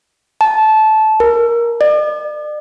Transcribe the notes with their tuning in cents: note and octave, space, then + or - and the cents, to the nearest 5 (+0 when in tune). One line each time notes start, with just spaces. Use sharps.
A5 -15
A#4 +10
D5 +40